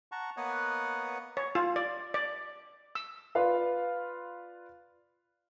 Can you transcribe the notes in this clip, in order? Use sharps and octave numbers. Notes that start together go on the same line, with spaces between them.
F#5 A5 A#5 C#6
A#3 B3 B4 C#5 D#5 F#5
C#5
F4
D5
D5
E6
F4 B4 D5 F5